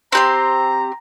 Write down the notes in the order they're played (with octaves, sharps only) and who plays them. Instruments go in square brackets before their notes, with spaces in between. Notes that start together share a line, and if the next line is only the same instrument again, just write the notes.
[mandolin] C4 G4 C6 [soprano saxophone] A#5